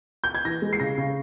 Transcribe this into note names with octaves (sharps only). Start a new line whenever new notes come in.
G6
G#6
E3 A#6
G#3
C7
C#3 A#6
C#3